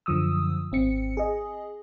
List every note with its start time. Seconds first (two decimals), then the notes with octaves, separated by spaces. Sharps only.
0.06 F#2 D3 F3 D#6 E6
0.72 G#1 C4 C#7
1.17 G#4 D#5